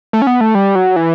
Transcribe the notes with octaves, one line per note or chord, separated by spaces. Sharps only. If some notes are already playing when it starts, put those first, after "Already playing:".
A3
C#4
B3
A3
G3
F#3
E3